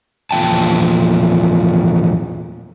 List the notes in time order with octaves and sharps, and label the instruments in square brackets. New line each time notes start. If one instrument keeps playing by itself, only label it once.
[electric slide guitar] E2 A#2 F3 G5 A5